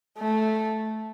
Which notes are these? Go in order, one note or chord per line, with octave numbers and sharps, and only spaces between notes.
A3